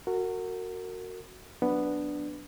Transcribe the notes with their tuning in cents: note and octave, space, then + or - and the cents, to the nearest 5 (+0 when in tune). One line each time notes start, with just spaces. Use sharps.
F#4 +0 A#4 -30
F#3 +0 B3 +0 D4 +0